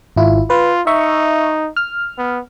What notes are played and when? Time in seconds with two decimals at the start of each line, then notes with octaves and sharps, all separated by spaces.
0.16 G#1 E4 F4
0.50 F4 B4
0.87 D#4 E5 C#6
1.77 F6
2.18 B3